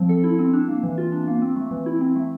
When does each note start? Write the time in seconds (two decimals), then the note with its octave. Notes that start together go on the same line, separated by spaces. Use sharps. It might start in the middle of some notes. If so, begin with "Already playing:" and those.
Already playing: F3 C4
0.09 A4
0.24 E4
0.39 C4
0.53 D4
0.68 A#3
0.83 E3
0.98 F4
1.12 D4
1.27 A#3
1.42 C4
1.56 A3
1.71 E3
1.86 E4
2.01 C4
2.16 A3